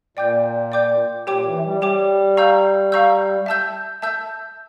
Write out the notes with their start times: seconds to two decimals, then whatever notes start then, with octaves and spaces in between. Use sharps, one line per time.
0.17 A#2 D5 G5 D6 G6
0.72 D5 G5 D6 G6
1.27 A#2 G4 C#5 G5 D6
1.46 E3
1.64 G3
1.82 G3 G4 C#5 G5 D6
2.37 F5 A#5 C#6 E6 G6
2.92 F5 A#5 C#6 E6 G6
3.46 E5 A5 E6 G6
4.02 E5 A5 E6 G6